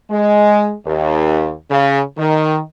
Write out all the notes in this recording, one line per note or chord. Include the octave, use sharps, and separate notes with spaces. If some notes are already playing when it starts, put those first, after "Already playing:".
G#3
D#2
C#3
D#3